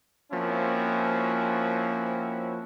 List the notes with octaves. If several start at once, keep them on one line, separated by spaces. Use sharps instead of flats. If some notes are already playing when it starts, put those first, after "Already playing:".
F3 A#3 C4 C#4 E4 F#4